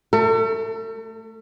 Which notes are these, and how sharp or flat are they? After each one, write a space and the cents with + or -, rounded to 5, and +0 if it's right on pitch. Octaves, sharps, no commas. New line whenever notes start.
A3 +0 A4 +40